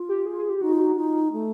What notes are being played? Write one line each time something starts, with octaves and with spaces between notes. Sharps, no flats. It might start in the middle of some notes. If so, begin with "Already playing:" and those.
Already playing: F4
G4
G#4
G#4
G4
D#4 F#4
F4
F#4
D#4 F4
A3